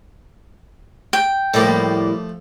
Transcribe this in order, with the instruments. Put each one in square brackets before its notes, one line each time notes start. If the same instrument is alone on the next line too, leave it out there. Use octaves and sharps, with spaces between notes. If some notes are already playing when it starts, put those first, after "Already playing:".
[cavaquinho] G5
[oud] A2 G3 A#3 [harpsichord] F3 A3